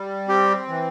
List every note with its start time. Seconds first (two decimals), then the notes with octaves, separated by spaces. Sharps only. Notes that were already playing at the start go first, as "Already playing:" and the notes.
Already playing: G3
0.28 C4 G4
0.68 E3